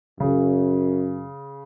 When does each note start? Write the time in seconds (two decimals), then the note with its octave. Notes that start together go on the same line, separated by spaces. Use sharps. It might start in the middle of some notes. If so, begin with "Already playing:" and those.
0.20 F#2 C#3